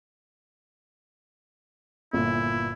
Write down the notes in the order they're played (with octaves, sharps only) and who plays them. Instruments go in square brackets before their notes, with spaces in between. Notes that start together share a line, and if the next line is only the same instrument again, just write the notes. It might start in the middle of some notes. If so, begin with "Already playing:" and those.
[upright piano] G1 A#2 [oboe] E4